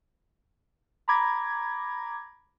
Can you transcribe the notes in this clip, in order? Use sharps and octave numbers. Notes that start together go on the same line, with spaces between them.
A#5 B5 D6 G#6 A#6